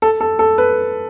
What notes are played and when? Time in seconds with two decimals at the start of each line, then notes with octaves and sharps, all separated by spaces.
0.02 A4
0.21 A4
0.39 A4
0.58 B4